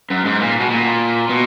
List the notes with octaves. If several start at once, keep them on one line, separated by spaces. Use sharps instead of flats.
F#2
G#2
A#2
B2
A#2
B2